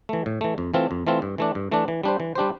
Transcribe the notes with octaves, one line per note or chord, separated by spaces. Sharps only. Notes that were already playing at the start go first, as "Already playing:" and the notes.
E3 A3
A2
E3 A3
F2
E3 A3 C4 F4
F2
E3 A3 C4 F4
G2
E3 A3 D4
G2
E3 A3 D4
E3
G3 D4 G4 C5
E3
G3 D4 G4 C5